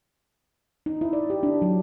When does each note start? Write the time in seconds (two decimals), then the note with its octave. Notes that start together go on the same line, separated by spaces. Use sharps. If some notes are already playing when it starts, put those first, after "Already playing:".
0.86 D#4
1.01 E4
1.13 D5
1.30 G4
1.43 D4
1.62 F#3